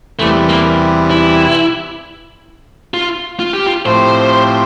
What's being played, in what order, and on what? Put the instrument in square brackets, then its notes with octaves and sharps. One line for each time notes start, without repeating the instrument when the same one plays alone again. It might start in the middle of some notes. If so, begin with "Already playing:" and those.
[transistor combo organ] E2 C3 E3 G3 [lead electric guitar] A3
[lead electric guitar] A#3
E4
F4
F4
G4
F4
[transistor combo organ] A2 F3 C4 G4 [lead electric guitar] C5